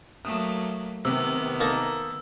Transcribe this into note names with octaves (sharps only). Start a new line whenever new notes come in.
F#3 A3 A#3 D#6
C3 D#3 B3 E6
A#3 D#4 A4